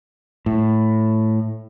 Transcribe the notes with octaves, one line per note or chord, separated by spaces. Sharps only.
A2